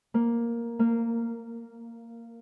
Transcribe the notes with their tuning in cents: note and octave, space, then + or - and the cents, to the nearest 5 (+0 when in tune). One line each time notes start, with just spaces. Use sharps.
A#3 +5
A#3 -15